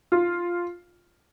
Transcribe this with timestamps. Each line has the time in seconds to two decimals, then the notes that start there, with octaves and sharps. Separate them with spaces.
0.12 F4